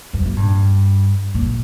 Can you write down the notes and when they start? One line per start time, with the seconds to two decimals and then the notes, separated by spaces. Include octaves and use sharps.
0.13 F#2
0.26 A#2
0.37 G2
1.34 A#2